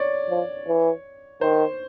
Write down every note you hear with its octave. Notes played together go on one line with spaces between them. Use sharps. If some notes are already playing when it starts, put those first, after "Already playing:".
Already playing: C#5 D5
F3
E3
D#3 C5